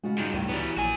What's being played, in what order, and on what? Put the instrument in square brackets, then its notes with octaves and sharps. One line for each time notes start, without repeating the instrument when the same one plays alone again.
[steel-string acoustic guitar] C#3 F4 F#4 [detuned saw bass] G#3
[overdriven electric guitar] G2 D#3
[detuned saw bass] C#2 [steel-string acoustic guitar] A2 G3
[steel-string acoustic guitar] E3 F#3 [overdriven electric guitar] G3 B3
[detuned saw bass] A#1 [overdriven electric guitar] F#4 G#5